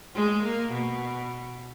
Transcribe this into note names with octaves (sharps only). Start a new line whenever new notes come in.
G#3
A#3
B2